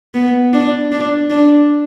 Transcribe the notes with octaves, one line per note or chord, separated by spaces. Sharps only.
B3
D4
D4
D4